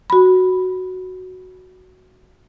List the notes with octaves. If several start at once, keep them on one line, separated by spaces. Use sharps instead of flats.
F#4 B5